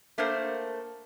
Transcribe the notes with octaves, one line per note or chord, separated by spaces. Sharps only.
A3 A#3 D4 A#4 C5